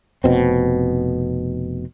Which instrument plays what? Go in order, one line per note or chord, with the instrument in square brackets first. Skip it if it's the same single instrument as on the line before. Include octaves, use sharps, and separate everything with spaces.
[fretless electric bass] F1 B2 C4